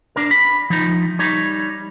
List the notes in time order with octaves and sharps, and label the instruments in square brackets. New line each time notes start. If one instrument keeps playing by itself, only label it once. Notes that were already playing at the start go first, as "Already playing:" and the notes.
[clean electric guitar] D4 A#4
B5
F3 D#4
G3 D#4 C#5